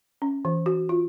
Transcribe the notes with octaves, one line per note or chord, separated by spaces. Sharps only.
C#4
E3
F#4
F4